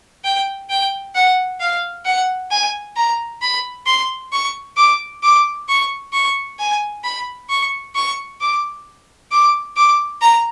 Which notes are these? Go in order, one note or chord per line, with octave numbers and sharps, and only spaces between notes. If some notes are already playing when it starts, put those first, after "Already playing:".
G5
G5
F#5
F5
F#5
G#5
A#5
B5
C6
C#6
D6
D6
C#6
C#6
G#5
B5
C#6
C#6
D6
D6
D6
A#5